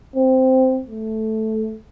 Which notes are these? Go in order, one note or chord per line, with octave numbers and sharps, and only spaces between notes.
C4
A3